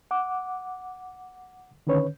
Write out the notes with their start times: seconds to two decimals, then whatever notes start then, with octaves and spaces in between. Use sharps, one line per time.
0.11 F#5 D6
1.87 D3 D#3 C#4 B4 C#5